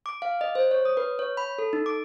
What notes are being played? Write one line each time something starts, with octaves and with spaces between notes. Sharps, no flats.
D6
F5
D#5
C5
C#5
D#6
B4
C#5
B5
A4
D#4
D6